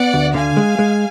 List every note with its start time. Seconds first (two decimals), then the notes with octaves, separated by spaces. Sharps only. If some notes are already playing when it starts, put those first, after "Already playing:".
Already playing: B3 D5 F#5
0.14 D2
0.34 D3 F5 G#5
0.57 G#3
0.79 G#3